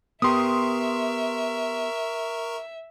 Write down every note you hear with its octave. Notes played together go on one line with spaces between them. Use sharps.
B3 G4 A#4 E5 A#5 C6 C#6 D#6